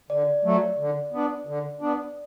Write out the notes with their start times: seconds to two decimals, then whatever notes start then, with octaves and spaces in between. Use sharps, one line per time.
0.10 D3 D5
0.44 F#3 A3
0.78 D3
1.13 B3 D4
1.47 D3
1.81 B3 D4